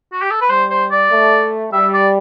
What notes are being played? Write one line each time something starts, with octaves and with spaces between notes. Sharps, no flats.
F#4
G4
A4
B4
G3 C5
C5
D5
A3
G3 E5
D5